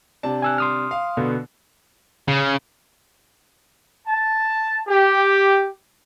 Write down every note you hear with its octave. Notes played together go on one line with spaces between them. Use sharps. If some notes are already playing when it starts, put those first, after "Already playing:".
C3 D4 A5
G#5 E6 F#6
C6 D#6 F6
F5
B2 D3 B3
C#3
A5
G4